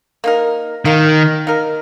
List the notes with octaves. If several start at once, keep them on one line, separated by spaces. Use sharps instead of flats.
A#3 D#4 A#4
D#3 A#3 D#4 A#4
A#3 D#4 A#4